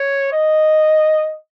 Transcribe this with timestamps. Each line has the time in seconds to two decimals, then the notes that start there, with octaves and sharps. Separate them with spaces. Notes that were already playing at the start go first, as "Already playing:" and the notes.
Already playing: C#5
0.33 D#5